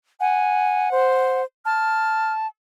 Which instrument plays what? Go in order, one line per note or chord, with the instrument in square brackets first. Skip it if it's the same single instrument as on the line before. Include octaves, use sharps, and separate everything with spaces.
[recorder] F#5 [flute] G#5
[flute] C5
[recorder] A5 [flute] F6